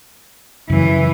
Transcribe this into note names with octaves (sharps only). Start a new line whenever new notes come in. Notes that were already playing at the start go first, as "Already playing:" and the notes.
F#2 C#3 E3